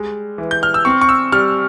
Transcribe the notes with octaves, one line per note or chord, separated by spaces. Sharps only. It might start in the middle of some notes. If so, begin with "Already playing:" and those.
Already playing: G3 G#3
E3
G6
F6
E6
C4 C#6
C#6
E6
G3 F6